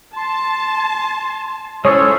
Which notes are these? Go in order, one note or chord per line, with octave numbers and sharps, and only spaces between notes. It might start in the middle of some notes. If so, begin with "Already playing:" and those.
A5 C6
G#3 C#4 E4 F4 G#4 A4 C5 C#5